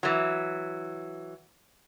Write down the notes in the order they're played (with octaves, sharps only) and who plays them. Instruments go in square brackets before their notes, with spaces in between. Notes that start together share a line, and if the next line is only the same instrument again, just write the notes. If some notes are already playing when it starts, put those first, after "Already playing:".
[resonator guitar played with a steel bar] E3 F#3